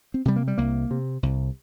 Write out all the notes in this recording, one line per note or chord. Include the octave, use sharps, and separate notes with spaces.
C4
C3 G3
A#3
G3
C2 A#3
C3
C2